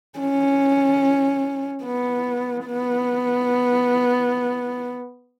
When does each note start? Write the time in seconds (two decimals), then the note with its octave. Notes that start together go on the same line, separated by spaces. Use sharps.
0.19 C#4
1.83 B3
2.66 B3